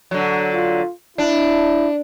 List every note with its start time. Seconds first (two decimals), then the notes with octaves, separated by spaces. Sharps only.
0.11 D3 F#3
0.54 F4
1.18 D4 E4